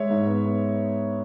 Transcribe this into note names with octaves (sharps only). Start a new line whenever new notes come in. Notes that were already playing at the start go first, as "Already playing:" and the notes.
Already playing: G#3 C#5 E5
G#2
B3
B3